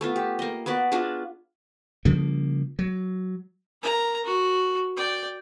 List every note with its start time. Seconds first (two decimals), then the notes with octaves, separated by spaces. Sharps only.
0.01 A3 B3 F4
0.16 G4
0.39 A#3 D#5
0.66 B3 F#4 B4 D5
0.92 D4 F4 F#4 G#4
2.05 C#3 F3 G3 A#3
2.79 F#3
3.82 A#4 A#5
4.24 F#4
4.97 D5 G5